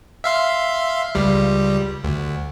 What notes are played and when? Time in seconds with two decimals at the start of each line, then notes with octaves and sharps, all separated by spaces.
0.24 E5 F5 C6
1.15 C#2 G3
2.04 D2